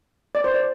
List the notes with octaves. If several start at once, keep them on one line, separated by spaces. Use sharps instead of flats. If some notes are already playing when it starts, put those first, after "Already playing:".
D5
C5
D5